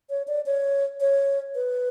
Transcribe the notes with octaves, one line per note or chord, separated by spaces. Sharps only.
C#5
D5
C#5
C#5
B4